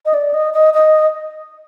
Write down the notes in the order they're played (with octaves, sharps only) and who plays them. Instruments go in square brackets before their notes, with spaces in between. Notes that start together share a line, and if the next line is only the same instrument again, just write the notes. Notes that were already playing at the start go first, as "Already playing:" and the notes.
[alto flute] D#5
D5
D#5
D#5
D#5